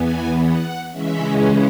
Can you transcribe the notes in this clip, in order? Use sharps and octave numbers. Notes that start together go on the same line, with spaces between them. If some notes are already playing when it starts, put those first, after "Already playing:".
Already playing: E2 E3 B3 G#5
F#5
C#3 E3 G#3 C#4 E5